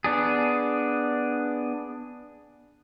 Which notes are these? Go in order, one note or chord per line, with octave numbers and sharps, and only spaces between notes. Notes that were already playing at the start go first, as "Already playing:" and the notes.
B3 D4 G#4